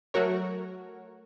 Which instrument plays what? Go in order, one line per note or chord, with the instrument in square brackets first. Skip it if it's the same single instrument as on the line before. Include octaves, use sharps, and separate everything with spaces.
[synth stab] F#3 A3 F#4 A#4 C#5